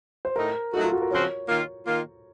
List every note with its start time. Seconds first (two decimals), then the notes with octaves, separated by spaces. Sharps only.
0.25 C5
0.36 A2 A3 D#4 A#4
0.74 F#3 A3 D#4 F#4 A4
0.83 F4
0.92 F#4
1.02 A#4
1.11 C#3 F3 C4 F#4 C5 C#5
1.48 D#3 A#3 F4
1.86 D#3 A#3 F4